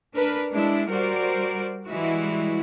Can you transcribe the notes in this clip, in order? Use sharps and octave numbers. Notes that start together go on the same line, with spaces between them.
D4 A#4 B4
G#3 D4 E4
G3 F#4 A#4 C5 D5
E3 G3 G#3 E4 F#4